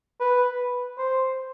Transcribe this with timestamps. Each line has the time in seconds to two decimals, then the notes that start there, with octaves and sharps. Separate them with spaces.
0.21 B4
0.98 C5